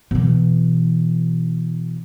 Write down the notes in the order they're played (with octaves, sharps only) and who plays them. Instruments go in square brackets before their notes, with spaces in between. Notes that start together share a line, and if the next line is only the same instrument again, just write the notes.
[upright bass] B2 E3